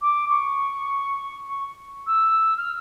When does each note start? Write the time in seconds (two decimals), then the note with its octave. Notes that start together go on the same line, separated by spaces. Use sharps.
0.01 D6
0.29 C#6
2.06 E6
2.57 F6